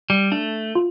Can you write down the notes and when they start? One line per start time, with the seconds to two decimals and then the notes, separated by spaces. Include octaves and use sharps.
0.10 G3
0.32 A3 D4
0.75 F4